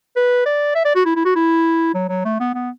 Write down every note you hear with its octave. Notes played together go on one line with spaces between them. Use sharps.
B4
D5
E5
D5
F#4
E4
E4
F#4
E4
F#3
F#3
A3
B3
B3